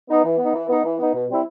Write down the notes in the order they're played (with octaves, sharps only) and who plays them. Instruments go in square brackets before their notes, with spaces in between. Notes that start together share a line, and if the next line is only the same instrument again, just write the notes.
[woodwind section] B3 D#4
E3
B3 D#4
E3
B3 D#4
E3
B3 D#4
B2
G3 C4 E4